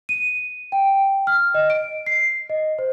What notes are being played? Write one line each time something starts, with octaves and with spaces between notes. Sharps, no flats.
D#7
G5
F6
D#5
D7
C7
D#5
C5